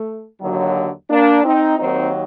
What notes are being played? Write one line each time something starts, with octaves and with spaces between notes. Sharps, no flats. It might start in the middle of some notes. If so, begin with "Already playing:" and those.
Already playing: A3
D#2 D3 F#3
A#3 D4
C4 D#4
D#2 D#3 F#3 C4 D#4